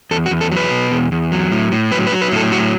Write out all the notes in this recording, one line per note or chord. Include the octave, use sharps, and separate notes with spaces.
E2 A4
F#4
E2
A4
F#3 B4
B2
E2
E2
F#3
A2
A2
F#3 B4
B4
F#3
B4
A2 A4
F#3 F#4